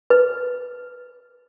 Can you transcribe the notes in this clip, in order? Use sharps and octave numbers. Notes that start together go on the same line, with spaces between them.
B4